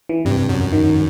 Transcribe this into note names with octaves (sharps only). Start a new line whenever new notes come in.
E3
G2 C3
F#2
D#3